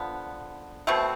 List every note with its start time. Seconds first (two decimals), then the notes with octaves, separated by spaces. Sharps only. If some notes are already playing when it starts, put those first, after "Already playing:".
Already playing: D3 F3 B3
0.87 B2 A3 C4